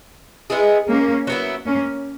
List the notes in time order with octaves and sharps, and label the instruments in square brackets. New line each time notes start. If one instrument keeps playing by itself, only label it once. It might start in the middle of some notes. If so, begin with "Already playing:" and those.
[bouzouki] G#3 B3 E4 G#4
[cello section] A#3 C#4
[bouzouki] F#3 B3 E4
[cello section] A#3 C#4